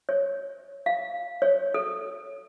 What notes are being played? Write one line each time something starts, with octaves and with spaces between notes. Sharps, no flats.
C#5
F5
C#5
A4